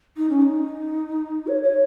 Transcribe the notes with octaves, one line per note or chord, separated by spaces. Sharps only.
D#4
C#4
D#4
C#5
C#5